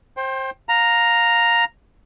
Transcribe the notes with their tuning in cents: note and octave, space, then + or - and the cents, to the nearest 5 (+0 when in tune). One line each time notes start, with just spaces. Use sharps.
C5 +25 G5 +0
F5 +20 A#5 +0